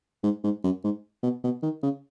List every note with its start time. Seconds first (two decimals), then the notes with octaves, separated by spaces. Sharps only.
0.23 G#2
0.44 G#2
0.64 F#2
0.84 G#2
1.23 B2
1.44 B2
1.63 D#3
1.83 C#3